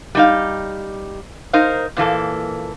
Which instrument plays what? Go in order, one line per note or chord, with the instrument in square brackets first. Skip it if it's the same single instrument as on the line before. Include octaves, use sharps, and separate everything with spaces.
[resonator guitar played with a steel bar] G3 D#4 F5
D#4 A#4 C5 F5
A#2 E3 A#3 A4